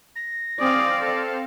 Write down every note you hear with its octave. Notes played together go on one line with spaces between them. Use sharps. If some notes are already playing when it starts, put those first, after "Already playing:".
A#6
C4 G#4 D5 F5
A4